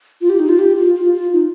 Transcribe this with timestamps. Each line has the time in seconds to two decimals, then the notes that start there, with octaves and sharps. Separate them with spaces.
0.21 F4
0.29 G4
0.39 D#4
0.49 F4
0.59 G4
0.77 F4
0.96 F4
1.14 F4
1.33 D#4